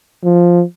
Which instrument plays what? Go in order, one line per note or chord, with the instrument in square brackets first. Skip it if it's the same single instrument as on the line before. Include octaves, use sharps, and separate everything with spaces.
[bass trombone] F3